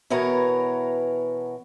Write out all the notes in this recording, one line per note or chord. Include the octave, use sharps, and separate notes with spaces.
B2 E3 B3 A#4 C#5 A#5